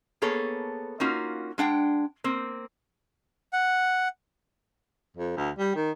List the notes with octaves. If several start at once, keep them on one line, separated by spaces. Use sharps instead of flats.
A#3 B3 G#4 A4 C#5
A#3 C#4 D#4 F4 F#4
G#3 D4 F#5 G5
A#3 C4
F#5
F2
D2
G3
D#3